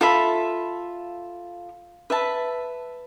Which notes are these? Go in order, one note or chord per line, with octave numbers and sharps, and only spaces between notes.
F4 A4 E5 B5
B4 E5 A5